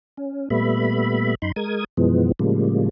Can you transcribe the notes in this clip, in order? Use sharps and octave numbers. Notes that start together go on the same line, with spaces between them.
C#4
A#2 G3 A3 B3 E5 B5
F#2 D#4 B5 C6
G#3 A#4 D#6 G#6
F#2 B2 E3 F3 G#3 B3
A2 C#3 F3 G3 G#3 A#3